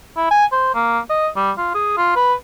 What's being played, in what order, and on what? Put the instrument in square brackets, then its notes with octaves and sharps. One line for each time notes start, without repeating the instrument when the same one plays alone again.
[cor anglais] E4
G#5
C5
A#3
D#5
G3
F4
G#4
F4
B4